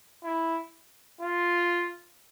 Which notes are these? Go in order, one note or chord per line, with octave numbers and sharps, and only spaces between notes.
E4
F4